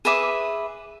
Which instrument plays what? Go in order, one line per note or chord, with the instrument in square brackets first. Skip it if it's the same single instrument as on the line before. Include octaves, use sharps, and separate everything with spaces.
[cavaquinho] G#4 B4 E5 D6